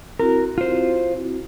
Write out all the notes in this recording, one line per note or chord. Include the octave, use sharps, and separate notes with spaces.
C4 E4 F#4 A#4
F4 C5